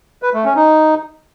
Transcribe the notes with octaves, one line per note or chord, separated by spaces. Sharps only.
B4
A3
C#4
D#4